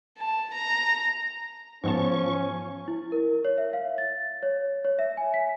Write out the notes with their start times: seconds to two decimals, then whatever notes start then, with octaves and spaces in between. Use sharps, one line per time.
0.19 A5
0.55 A#5
1.84 G#2 F3 B3 C#4 A5 C#6
2.88 E4
3.12 A#4
3.45 C#5
3.58 E5
3.73 F5
3.98 A6
4.43 C#5
4.84 C#5
4.99 E5
5.17 G#5
5.34 B6